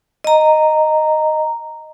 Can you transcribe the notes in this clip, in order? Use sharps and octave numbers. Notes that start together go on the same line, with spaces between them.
D#5 A#5